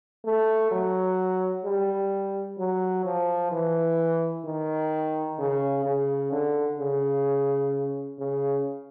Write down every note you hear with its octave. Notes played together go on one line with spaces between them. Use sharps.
A3
F#3
G3
F#3
F3
E3
D#3
C#3
C#3
D3
C#3
C#3